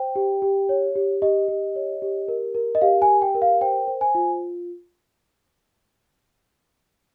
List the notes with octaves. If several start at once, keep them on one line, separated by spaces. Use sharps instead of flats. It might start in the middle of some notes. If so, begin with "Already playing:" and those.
Already playing: C5 G5
G4
G4
C#5
G4
G4 D#5
G4
C#5
G4
A#4
A#4
D#5
G4 F5
G#5
G4
G5
A#4
F5
C5 G5
C5
G#5
F4